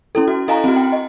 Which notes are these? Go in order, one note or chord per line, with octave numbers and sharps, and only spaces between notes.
C#4 E4 A4
F#4
E4 A4 D#5 F5 G#5 A#5
C4 F#4
G5
D#5